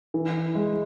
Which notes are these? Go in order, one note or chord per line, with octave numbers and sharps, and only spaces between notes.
E3
G#3